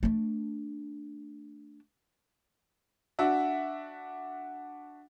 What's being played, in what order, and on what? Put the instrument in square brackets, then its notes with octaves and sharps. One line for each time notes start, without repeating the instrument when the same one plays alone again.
[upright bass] A3 D4
[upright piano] D4 F#4 E5